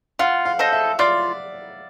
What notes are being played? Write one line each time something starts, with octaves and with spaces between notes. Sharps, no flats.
F4 F#5
F5
A4 C5 D#5
E5
F4 D5